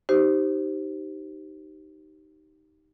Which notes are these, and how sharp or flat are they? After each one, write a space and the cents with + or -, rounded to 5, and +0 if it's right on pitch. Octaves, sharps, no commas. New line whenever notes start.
D#4 +0 G4 -15 C5 +0